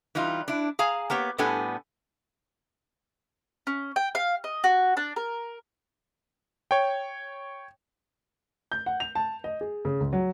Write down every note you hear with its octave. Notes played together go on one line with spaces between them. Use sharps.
E3 G3 D#4 F4
D4 E4
G#4 F5 G#5 A#5
A#3 B3 G4 C#5
A2 G3 B3 D4 A4 G#5
C#4
G5
F5
D#5
F#4
D4
A#4
C#5 G5
G6
F#5
F7
A5
D#5
G#4
C#3
C#2
F#3